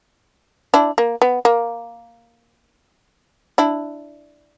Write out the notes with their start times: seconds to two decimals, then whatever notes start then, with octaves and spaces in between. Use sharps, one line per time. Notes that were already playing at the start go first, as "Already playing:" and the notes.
0.74 D4 E4
0.98 A#3
1.22 B3
1.45 A#3
3.58 D4 E4